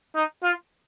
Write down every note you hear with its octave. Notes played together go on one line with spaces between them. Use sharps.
D#4
F4